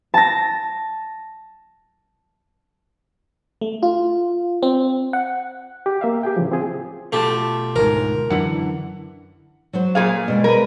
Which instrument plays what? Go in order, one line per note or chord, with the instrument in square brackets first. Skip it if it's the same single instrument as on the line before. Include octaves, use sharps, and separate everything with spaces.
[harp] A5 A#6
[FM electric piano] A3
F4
C4
F#5
[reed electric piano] G4
A#3 E5 F5
G4 G#4 G5
A2 C#3 E3 F3
C4 F4 G#4
[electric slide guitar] B2 F4 A5 [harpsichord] A3 G4
[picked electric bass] G#1 D2 G#2 [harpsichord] A#4
[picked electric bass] F#2 D3 E3 [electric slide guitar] F#5
[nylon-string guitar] F#3 F#4 C5
[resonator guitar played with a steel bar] A#2 G#4 F5
[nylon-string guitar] B2 G3 G#3
[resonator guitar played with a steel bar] A#4 B4